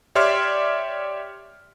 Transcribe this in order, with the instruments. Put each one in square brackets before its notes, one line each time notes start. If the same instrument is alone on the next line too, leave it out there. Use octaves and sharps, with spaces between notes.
[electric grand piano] G4 C#5 D5 E5 C6 F6